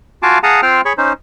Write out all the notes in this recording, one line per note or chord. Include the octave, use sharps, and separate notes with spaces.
F4 F#4 F5 G#5 A5 D6
G#4 F5 F#5 A5 A#5 D#6
C4 F4 C5 F5 G5 F6
G#4 C#5 B5 C#6
C#4 D#4 C5